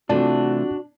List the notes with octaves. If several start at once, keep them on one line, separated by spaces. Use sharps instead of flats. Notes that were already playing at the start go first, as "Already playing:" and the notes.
C3 E3 A3 D4 F4 F#4 D5 A5